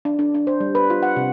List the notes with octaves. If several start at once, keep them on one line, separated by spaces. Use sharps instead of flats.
D4
D4
D4
C5
G3
B4
F4
F#5
C3